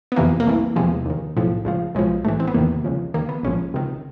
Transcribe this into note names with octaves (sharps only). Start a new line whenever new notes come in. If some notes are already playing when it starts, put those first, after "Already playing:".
B3
F2 C3 E3 A#3
A#3
C2 C3 E3 A3
E2 C3 F3 G#3
D#2 D#3
B1 A2 F3
C#2 C#3 F3
B1 A2 F3 G#3
A1 G#2 E3 A3
C4
B3
E2 C3 D#3 A#3
C#2 C#3 F3
D#2 D#3 A#3
B3
A#1 G#2 F3 C#4
C#2 C3 D#3